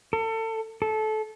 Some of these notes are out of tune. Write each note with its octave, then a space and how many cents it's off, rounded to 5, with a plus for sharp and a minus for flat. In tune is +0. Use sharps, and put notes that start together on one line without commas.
A4 +30
A4 -20